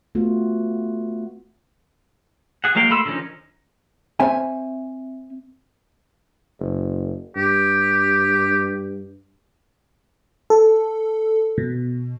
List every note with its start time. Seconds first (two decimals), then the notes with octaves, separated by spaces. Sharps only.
0.15 A3 B3 F4 F#4
2.64 G#4 F#5
2.75 F#3 G#3 A#3 F5 G5
2.90 A3 B5 C6 E6
3.05 D3 D#3 F3 C#4 D#4
4.20 C4 C#5 E5 G#5
6.60 F#1
7.36 G2 G4
10.50 A4
11.58 B2